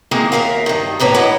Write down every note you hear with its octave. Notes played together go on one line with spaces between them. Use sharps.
D#3 G#3 A#3 C4 E4
D#2 C3 A#4 E5 F5
G2 D#3
D#2 A2 A#3 B4 C#5
E4 D#5 F#5